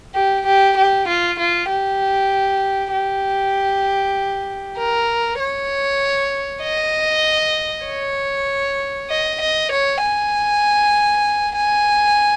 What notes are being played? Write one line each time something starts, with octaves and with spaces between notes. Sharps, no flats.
G4
G4
G4
F4
F4
G4
G4
A#4
C#5
D#5
C#5
D#5
D#5
C#5
G#5
G#5